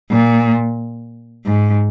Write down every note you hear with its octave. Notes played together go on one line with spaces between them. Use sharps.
A#2
G#2